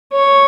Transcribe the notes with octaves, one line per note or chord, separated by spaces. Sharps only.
C#5